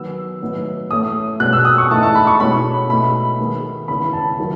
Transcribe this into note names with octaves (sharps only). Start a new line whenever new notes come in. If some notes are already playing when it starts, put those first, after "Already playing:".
Already playing: D#3 F#3 B3 E6
A2 F#3 B3 D#4
A2 E3 A3 C#4 D#6
B2 G#3 C#4 F#6
E6
D#6
C#6
E3 A3 D#4 A5
A5
B5
C#6
B2 G#3 C#4 E4 B5
B2 A3 D#4 B5
D#3 G#3 B3
C#3 E3 B3 E4 B5
A5
D#3 F#3 B3 E4